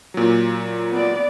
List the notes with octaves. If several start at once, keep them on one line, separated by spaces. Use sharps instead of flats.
A#2 F#3
B3 D5